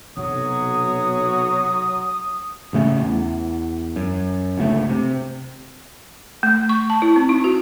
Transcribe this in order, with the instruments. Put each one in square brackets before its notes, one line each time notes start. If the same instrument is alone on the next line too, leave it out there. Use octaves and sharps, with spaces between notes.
[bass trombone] B1 [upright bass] C3 [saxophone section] F#3 [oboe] D#6
[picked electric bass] A1 C#3 A3 C#4
E2
F#2
G1 C#2 C3 A3
C3
[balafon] A3
C#6
A5
E4
C4
D#4
F#4